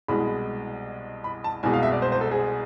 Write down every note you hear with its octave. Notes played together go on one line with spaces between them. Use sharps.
C2 B2 G#3 B5
B5
A5
C2 B2 G#3 G#5
F5
E5
D5
C5
C5
A4
G#4